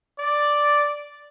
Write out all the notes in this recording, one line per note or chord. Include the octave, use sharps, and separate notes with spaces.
D5